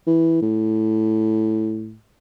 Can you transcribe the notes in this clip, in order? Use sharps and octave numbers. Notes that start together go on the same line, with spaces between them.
E3
A2